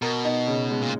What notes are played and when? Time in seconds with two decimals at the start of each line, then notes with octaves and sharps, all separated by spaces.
0.02 B2 A#4
0.25 D#4
0.47 C#3
0.71 G#3
0.82 A#2